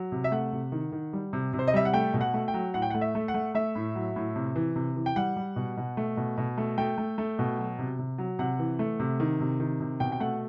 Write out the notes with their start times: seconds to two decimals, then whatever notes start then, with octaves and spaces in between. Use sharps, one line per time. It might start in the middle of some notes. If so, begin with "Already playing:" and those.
Already playing: F#3
0.12 C3
0.24 E5
0.32 A3 F#5
0.52 C3
0.72 D#3
0.92 D#3
1.13 G3
1.33 C3
1.53 C3
1.59 C5
1.67 D#5
1.74 G3 E5
1.85 F#5
1.94 A3 G5
2.14 B2
2.21 F#5
2.34 A3
2.48 G5
2.54 F#3
2.74 A2 F#5
2.82 G5
2.90 F#5
2.95 A3
3.01 E5
3.15 A3
3.28 F#5
3.34 A3
3.54 A3 E5
3.75 A2
3.95 F#3
4.16 A2
4.36 C3
4.56 E3
4.76 C3
4.96 E3
5.06 G5
5.16 G3 F#5
5.36 G3
5.56 B2
5.77 B2
5.97 A3
6.17 B2
6.37 B2
6.58 A3
6.78 A3 G5
6.98 A3
7.18 A3
7.39 B2
7.58 F#3
7.79 C3
7.99 C3
8.18 F#3
8.39 C3 F#5
8.59 E3
8.79 A3
9.00 C3
9.20 D#3
9.40 C3
9.60 D#3
9.80 C3
10.00 B2 G5
10.12 G5
10.20 A3 F#5